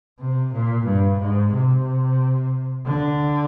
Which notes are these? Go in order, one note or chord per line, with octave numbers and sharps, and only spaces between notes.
C3
A#2
G2
G#2
C3
D3